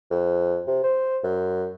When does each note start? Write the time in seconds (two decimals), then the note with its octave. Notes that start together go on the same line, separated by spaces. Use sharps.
0.11 F2
0.67 C3
0.84 C5
1.24 F#2